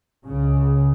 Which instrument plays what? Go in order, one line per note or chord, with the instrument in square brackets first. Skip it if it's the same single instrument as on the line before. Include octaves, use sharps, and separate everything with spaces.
[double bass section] C#2 C#3